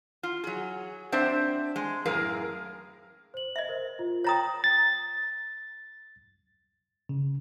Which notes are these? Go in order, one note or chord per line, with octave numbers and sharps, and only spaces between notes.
F4
F#3 G#4
C4 D4 C5 E5
G#3
F#2 A2 G#4 A#4 F5
C5 F#7
D#5 E5
A#4 C5
F4
C#5 G5 A#5 D#6 A6 A#6
A6
C#3